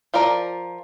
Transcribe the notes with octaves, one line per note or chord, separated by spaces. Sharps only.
F3 F4 A#4 D5 A#5